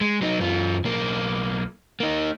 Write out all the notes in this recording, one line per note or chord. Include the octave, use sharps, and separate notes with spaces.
G#3
F#3 D#4
F#2 F4
B1 A#3
A#3 D#4